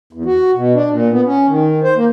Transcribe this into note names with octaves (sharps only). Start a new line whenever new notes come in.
E2
F#4
B2
D4
A#2
B3
C#4
D#3
C5
A#3